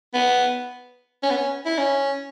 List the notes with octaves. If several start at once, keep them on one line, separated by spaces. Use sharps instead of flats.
B3
C#4
B3
C#4
E4
C#4